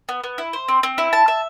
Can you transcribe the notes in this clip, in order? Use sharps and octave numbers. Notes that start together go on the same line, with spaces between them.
B3
B3
E4
C5
C4
C4
E4
A5
E5